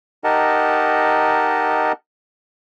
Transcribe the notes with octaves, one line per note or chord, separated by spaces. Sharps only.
D#4 G4 A#4 D#5 F#5 A5